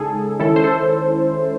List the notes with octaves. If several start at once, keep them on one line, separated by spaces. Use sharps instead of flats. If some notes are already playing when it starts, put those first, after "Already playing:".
Already playing: C#3 G#3 D#4 G#4 A4
D#3 G#3 C#4 E4 A4
C5
A4